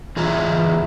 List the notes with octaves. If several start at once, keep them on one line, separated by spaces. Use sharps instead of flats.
E2 F4 G#4 D#5 E5 A#5